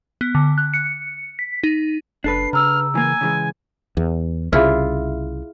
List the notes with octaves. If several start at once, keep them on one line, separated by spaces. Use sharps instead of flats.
B3
D3
F#6
C#7
B6
D#4
F#1 D4 A4 B4 C7
C#3 A#5 E6 F6
E3 A#3 G#5
C#3 E3 G#3
E2
C2 C#3 E4 F4 G#4 E5 F6